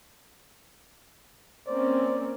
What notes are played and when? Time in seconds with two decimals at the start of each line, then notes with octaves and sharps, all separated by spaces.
1.67 A#3 C4 C#4 C5 D5